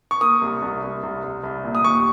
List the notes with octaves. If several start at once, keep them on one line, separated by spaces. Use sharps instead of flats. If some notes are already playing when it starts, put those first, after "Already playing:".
C#6
A#3 D#6
C2
C2
C2
C2
C2
C2
A#2
D#6
D#2 C#6